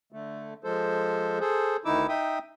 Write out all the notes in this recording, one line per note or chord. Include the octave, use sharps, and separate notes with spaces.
D3 A3
F3 G#3 A4 C5
G#4 A4 C5
D2 D#3 D#4 E4 D6 E6
D#4 E5 G5 D#6